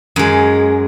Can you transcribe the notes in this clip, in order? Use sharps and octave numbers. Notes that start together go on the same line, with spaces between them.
F#2 G#3